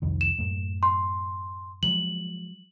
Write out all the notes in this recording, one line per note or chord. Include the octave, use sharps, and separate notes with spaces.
C2 F2 D#3
E7
F#2 A2
C6
F3 F#3 G#3 F#7